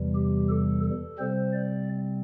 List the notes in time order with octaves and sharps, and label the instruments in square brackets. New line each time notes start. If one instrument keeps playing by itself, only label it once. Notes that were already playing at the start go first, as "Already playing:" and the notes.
Already playing: [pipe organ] E2 C3 E3 G3
G4
A4
A4
C3 G3 C4 C5
D5